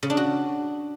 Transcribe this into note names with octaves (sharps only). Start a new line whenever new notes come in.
C#3
D4
F#4